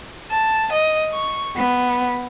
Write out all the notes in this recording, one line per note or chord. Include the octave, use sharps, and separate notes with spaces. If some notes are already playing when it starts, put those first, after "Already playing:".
A5
D#5
C#6
B3